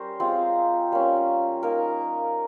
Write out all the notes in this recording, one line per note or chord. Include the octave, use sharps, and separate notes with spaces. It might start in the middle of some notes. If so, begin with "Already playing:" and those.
Already playing: G3 C#4 A#4 C5
G#3 C4 F4
G3 A#3 C#4
A#3 D#4 A#4